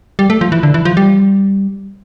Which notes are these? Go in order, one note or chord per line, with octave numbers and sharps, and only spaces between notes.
G3
A3
F3
E3
D3
E3
F3
G3